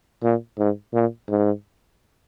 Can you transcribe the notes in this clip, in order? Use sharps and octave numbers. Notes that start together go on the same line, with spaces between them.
A#2
G#2
A#2
G#2